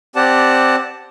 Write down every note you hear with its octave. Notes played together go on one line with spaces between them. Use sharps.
C4 G4 D5 F#5 A5